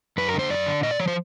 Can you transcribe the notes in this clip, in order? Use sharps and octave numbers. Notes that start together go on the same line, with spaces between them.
F#2 B4
A#4
D3
C5
F#2 D5
D3
A#2 D#5
D5
F3 C#5
C5